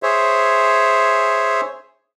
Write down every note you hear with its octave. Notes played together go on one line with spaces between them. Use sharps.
G#4 C5 C#5 E5